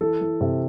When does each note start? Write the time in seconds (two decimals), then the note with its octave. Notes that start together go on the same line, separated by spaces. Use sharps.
0.01 E3 A4
0.21 E3
0.41 C3